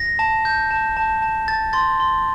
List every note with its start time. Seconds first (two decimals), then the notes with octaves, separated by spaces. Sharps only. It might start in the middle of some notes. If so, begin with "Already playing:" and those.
Already playing: A#6
0.19 A5
0.45 G6
0.71 A5
0.97 A5
1.22 A5
1.48 A5 A6
1.73 C6 A6
2.00 C6